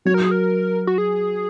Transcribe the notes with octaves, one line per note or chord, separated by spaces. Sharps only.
F#3 C#5
A#4
G#4
A#4
F#4
G#4